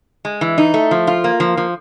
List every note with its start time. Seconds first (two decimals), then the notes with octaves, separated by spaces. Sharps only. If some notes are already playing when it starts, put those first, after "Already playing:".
0.25 G#3
0.41 E3
0.58 D#4
0.74 A3
0.91 F3
1.07 F4
1.24 A#3
1.40 F3
1.57 F3